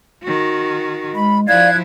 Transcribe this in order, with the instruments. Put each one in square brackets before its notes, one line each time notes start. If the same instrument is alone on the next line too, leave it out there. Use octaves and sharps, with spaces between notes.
[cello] D#3 F#4
[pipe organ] G#3 [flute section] B5
[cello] F3 E4 [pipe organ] D5 F5 [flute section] F#6 G#6